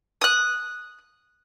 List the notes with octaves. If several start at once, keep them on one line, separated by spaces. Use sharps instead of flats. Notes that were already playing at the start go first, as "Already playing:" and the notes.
D#6 F#6